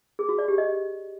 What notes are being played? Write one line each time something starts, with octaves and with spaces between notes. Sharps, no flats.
G#4
F#4
D5
G4
D#5